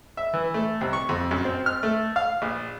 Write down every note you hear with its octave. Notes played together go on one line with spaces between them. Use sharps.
E5
E3
A3
C2
C#6
F2
F#2
C4
F6
A3
F5
A#1